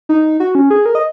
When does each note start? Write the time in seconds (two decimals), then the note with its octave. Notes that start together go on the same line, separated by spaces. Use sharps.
0.09 D#4
0.40 F#4
0.55 C#4
0.70 G#4
0.86 A#4
0.95 D#5